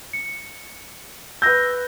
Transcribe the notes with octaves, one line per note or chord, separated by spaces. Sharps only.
C#7
B4 E6 G6 A#6